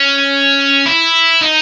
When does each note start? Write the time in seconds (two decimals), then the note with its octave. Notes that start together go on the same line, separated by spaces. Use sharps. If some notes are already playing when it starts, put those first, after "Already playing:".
Already playing: C#4
0.86 E4
1.41 D#4